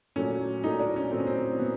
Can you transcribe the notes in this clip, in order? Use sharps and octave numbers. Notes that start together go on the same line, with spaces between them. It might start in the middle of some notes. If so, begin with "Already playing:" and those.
A#2 F#3 A3 C#4
A#2 F#3 A3 D#4
D4
C#4
A#2 F#3 A3 C4
C#4
C4
A#2 F#3 B3